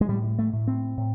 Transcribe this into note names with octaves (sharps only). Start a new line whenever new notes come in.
G#3
A2 G3
A3
A2
C4
A2